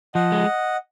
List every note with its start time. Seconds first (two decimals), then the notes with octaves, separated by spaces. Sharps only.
0.15 F3 D#5 F#5
0.32 G#3